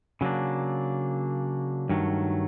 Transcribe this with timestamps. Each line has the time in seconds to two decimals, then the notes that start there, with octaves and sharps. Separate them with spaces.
0.21 C#3 F#3 A#3 D4
1.89 G2 D#3 F#3 A3